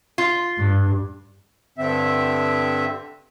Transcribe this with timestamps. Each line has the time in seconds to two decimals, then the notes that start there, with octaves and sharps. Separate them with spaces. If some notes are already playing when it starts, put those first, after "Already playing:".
0.18 F4
0.59 G2
1.78 G2 D3 C4 E5